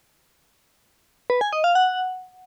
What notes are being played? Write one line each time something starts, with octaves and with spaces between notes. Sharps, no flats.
B4
G#5
D#5
F5
F#5